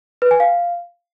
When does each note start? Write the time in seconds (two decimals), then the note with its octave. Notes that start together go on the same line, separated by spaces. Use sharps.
0.22 B4
0.31 G#5
0.40 F5